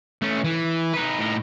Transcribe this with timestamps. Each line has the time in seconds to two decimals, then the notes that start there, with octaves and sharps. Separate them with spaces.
0.22 A3 C#4
0.44 E3
0.93 D#4 B4
1.19 A2 D#4